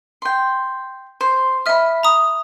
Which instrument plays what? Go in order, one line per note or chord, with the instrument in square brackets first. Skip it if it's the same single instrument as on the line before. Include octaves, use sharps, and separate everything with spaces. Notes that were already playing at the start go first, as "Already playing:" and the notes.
[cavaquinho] G5 C6
C5
[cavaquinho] D#5 B5 [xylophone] E5 F6
[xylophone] A#5 D#6